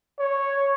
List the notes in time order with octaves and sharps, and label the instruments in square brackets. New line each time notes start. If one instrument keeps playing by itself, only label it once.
[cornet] C#5